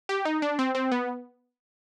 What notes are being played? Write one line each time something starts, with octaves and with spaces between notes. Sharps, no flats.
G4
D#4
D4
C4
C4
B3